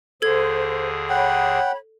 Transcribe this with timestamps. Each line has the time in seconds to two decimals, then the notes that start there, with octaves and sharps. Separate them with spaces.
0.22 D#2 D3 G#4 A4 C5 G#6
1.09 C#5 F#5 G5 B5